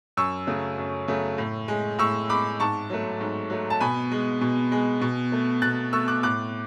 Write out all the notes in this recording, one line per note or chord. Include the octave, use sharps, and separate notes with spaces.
F#2 C#6 E6
C#3 F#3 A3
F#2
C#3 F#3 A3
A2
G#3
A2 C#6 E6
G#3 B5 D6
G#2 A5 C#6
F#3 A3
G#2
F#3 A3
A5
B2 G#5 B5
G#3
B2
G#3
B2
A3
B2 F#6 A6
A3 C#6 E6
D6 F#6
A2 D6 F#6